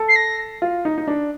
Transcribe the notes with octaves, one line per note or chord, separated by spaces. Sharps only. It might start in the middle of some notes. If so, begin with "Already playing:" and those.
Already playing: A4
C7
A#6
F4
D#4
D#4
D4